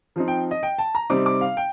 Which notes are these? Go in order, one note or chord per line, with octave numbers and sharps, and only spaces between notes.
F3 C4 D#4
G5
D#5
G5
A5
A#5
C3 G3 C4 D#4 D6
D6
F5
G5